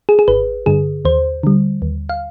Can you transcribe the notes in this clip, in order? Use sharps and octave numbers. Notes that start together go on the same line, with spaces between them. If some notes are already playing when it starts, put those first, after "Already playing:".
G#4
G#4
G#1 B4
G2 D3 G#4
D#2 C5
D3 G3
D#2
F5